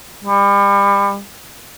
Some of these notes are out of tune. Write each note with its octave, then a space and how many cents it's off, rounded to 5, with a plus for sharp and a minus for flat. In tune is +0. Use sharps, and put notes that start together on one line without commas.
G3 +35